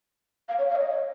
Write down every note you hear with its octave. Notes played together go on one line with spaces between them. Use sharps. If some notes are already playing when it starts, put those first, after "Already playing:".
F5
C#5
F5
C#5
D#5
C#5